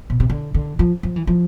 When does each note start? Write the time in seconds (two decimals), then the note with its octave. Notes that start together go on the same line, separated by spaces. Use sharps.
0.10 B2
0.20 C3
0.30 D3
0.54 D3
0.79 F3
1.03 F3
1.16 E3
1.27 F3